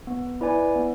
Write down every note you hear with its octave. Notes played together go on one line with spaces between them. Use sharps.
B3
E4 B4 D5 G#5
B3